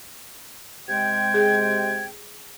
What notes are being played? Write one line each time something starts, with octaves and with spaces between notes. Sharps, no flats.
C3 G#3 G5 G#6
G#4